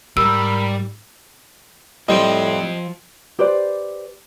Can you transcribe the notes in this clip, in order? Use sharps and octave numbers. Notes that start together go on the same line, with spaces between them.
G#2 G3 A#4 B5 E6
A2 F3 G3 C4 C5 D#5 G5
G4 B4 C5 D5